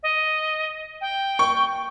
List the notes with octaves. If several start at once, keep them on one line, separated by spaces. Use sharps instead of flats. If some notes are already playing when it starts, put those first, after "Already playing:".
D#5
G5
C#6